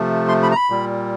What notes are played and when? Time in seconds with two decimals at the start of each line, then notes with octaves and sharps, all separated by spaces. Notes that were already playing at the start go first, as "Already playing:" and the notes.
Already playing: C3 F3 A3
0.29 C6
0.43 B5
0.51 A#5
0.56 B5
0.70 A#2 G3